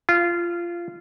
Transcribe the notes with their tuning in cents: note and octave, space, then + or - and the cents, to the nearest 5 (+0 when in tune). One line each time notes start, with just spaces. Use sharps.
F4 -15